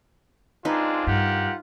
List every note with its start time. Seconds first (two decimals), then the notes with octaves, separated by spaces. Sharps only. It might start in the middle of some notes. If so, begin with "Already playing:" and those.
0.65 G#3 C4 D4 D#4 F4 B4
1.07 G2 G4 A#4 F#5